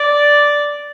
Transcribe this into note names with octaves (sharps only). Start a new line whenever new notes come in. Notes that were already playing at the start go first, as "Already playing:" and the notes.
Already playing: D5